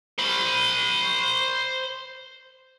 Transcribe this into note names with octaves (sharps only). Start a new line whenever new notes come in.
C5 B5